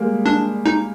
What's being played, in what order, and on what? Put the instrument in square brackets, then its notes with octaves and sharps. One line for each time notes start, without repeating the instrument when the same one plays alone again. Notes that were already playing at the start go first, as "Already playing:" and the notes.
Already playing: [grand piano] G3 G#3 A#3
[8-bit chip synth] D4
D#4